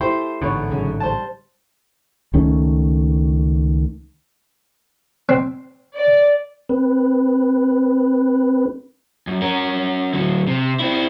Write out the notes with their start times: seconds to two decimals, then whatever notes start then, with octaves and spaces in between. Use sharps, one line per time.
0.01 A3 E4 G4 C5
0.42 A1 G#2 D3 B3 C#5
0.70 F#2 C#3
1.00 G3 C5 A5
2.33 C#2 D#3 A3 C#4
5.29 C4
5.93 D5
6.69 C4 B4
9.27 F#2
9.42 C#4 A#4
10.14 D2 F#3
10.47 C3
10.79 C4 E4